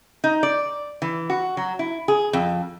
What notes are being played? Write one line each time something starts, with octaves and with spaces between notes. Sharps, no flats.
D#4
D5
E3
F#4
F#3
E4
G#4
F2